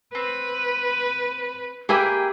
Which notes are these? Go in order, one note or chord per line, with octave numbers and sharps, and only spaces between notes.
C4 B4
A#3 G4 G#4 B4 E5 G5